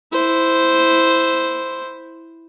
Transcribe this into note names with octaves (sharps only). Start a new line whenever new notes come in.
E4 C5